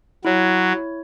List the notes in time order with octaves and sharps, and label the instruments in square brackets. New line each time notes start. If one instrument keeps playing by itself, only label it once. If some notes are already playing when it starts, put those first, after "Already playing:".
[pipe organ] F#3 [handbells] E4 C#5